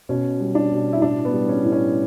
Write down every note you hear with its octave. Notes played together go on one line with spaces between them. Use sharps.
B2 C#4
G3
D4
B2
E4
A2 D4
B3
G3
C#4
A2
C#4